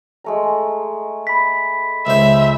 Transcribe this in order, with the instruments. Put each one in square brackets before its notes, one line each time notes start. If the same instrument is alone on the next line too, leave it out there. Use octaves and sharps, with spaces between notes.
[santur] G#3 A3 A#5
[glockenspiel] B5 B6
[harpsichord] C#2 C5 [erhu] E5